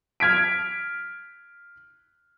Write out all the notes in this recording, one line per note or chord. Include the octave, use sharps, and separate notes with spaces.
F6 G#6 B6 D7